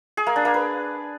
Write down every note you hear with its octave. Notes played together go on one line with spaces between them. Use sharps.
G#4
A#3
D4
A#3
B4